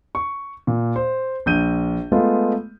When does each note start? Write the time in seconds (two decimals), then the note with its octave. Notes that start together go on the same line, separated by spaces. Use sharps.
0.15 C#6
0.67 A#2
0.96 C5
1.46 A#1 G6 D#7
2.12 G#3 A3 B3 F4